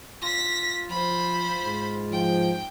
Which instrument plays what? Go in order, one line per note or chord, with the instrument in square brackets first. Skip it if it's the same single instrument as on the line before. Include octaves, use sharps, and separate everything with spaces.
[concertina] F4 [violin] A#6 B6
[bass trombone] F3 [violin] C5 B5
[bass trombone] G#2
[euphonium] F3 [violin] G5